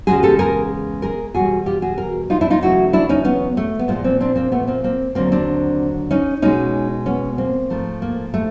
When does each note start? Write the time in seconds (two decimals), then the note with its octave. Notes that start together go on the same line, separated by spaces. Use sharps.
0.07 E2 C#3 F3 G#3 F#4 G#4
0.23 G4 A4
0.39 G#4 A#4
1.02 G#4 A#4
1.35 E2 B2 G3 F#4 G#4
1.66 F4 G4
1.82 F#4 G#4
1.98 G#4 A#4
2.30 D#4 F4
2.41 D4 E4
2.50 D#4 F4
2.61 E2 C#3 F#3 A3 E4 F#4
2.93 D4 E4
3.09 C#4 D#4
3.24 B3 C#4
3.57 A3
3.79 B3
3.88 A#2 F3 G#3 A#3
4.04 A#3 C4
4.21 C4 D4
4.36 A#3 C4
4.52 A3 B3
4.67 A#3 C4
4.84 A#3 C4
5.15 D#2 D3 F#3 A#3 C4
5.32 C4 D4
6.11 C#4 D#4
6.42 B2 G#3 C#4 D#4
7.06 B3 C#4
7.38 A#3 C4
7.70 G#2 F3 A3
8.02 A#3
8.34 A3